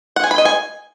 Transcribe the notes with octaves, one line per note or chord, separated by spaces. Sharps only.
F#5
G#5
B5
D#5
G#5